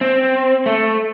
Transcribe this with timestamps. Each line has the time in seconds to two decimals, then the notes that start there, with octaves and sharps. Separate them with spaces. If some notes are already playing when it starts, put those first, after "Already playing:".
0.01 C4
0.66 A3